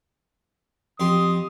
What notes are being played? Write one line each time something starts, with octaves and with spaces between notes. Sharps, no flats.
F2 G4 C6 D#6